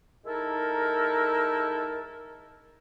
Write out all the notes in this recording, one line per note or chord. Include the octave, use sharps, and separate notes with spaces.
G#3 D#4 E4 A4 A#4